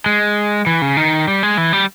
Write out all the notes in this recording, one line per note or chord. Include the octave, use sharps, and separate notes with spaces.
G#3
E3
C#3
D#3
G3
G#3
E3
G3